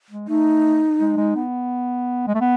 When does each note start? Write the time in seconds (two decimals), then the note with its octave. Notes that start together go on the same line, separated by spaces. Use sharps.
0.11 G#3
0.28 A3 D#4
1.00 G#3
1.17 G#3
1.36 B3
2.27 G#3
2.35 A3
2.41 B3